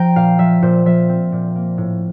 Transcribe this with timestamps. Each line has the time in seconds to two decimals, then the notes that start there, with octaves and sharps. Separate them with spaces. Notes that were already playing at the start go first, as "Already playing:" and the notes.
Already playing: F3 G5 A#5
0.16 A#2 F5
0.39 F3 E5
0.62 A#2 C5
0.86 F3 E5
1.09 C4
1.32 A#2
1.56 A#3
1.78 A2